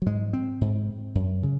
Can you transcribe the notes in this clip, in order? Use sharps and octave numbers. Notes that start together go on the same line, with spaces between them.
F#3
G#2 G#3
C4
G#2
F#2
C#3